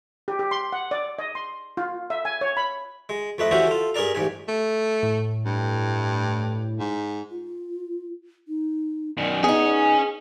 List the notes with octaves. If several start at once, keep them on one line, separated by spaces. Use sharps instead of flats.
G4
G4
C6
F#5
D5
D#5
C6
F4
E5
G#5
C#5
B5
G#3
F2 A3 B4 D#5
E3 G3 C#4 F#4 C5 E5
F4 A4
G2 G#4 A#4 D5 A#5
A1 G#2 G3 G#5
A3
A2
G2
G#2
F4
D#4
F#2 D#3 D5
B3 C#4 D#4 G#4 G#5